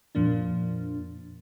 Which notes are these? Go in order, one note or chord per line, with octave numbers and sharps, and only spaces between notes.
F2 A#2 F3 A#3 D4